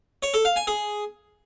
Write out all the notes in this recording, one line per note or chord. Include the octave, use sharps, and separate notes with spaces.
C#5
A4
F5
G#5
G#4